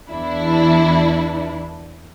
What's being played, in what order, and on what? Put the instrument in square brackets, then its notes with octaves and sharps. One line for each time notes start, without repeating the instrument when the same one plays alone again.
[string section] E2 E3 D4 E4